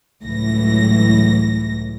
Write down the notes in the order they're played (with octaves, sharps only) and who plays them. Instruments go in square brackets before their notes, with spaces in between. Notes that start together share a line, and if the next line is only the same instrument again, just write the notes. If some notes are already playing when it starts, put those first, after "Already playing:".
[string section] C#2 A2 E3 F#3 A#6